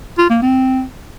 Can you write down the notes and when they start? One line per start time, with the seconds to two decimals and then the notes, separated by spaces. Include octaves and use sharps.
0.18 F4
0.30 A#3
0.42 C4